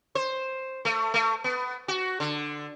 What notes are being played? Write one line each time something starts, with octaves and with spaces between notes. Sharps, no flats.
C5
A3
A3
B3
F#4
D3